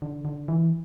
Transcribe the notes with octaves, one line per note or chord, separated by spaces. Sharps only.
D3
D3
E3